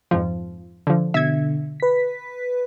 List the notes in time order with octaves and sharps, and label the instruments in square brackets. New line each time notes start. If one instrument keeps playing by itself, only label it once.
[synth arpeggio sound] F2 G#2 F3
D3 F3
[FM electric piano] B2 D3 [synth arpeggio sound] E5 G#6
[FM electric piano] B4 B6